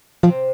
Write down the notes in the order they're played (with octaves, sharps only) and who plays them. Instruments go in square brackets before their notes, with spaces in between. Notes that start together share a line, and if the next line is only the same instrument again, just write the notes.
[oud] C3 C4 [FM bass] F3